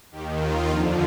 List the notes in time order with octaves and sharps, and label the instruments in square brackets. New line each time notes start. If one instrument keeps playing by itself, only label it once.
[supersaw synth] D#2 D#3 G4
F4
F2 D3 F3 D#4